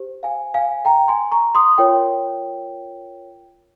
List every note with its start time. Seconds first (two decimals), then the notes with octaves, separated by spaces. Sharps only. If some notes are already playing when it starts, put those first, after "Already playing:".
Already playing: G4 C5
0.23 F5 G#5
0.54 F5 G#5
0.85 G5 A#5
1.08 G#5 C6
1.31 A#5 C#6
1.55 C6 D#6
1.78 F4 A#4 C#5 G5